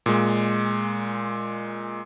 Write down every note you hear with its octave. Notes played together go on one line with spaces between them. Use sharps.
A#2 G#3